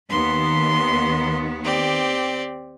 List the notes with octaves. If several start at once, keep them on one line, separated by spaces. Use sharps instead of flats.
D#2 D#3 B3 C6
C4 G4 D5